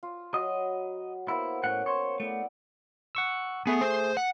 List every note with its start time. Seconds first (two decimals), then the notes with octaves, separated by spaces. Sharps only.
0.03 F4
0.34 F#3 D#5 B5
1.28 A#3 B3 E4 C5
1.64 A2 C#4 F#5 C#6
1.86 C5 C#5
2.20 A3 B3 E4 D5
3.15 F#5 C#6 E6
3.67 A3 B3 G#4
3.81 C5
4.17 F#5